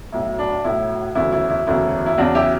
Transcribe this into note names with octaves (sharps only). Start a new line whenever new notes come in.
B1 A2 F#3 E4
D4
B1 A2 F#3 E4
E1 D2 C#3 F#3 E4
E4
E4
E1 D2 C#3 F#3 E4
E4
E2 C#3 F#3 D4 F#4
E4 G4